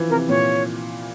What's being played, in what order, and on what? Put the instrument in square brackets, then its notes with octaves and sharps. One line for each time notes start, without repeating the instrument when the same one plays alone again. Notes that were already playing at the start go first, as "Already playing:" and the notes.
Already playing: [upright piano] E3 F3
[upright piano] C3 [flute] A#4
[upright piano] A#2 [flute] C#5